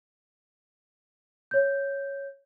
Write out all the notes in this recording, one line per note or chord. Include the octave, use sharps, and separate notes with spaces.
C#5 G6